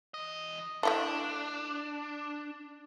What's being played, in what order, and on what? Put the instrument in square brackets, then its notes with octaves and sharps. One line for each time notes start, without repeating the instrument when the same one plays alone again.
[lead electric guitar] E3 D#5
[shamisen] A3 E4 A4 [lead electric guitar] D4